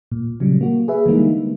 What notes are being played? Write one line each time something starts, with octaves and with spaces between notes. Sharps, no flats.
A#2
C#3 F#3 G3
A#3 F#4
G#4 B4 E5
D3 E3 G3 G#3 A#3 D#4